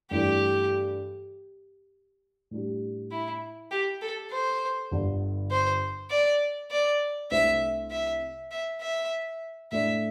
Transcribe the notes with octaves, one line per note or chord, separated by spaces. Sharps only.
G2 E3 A3 D4 G4 A4
A2 G3 D4 G4
E4
G4
A4
C5
G1 G2 D3
C5
D5
D5
C2 C3 A3 D4 C5 E5
E5
E5
E5
A2 A3 D4 E5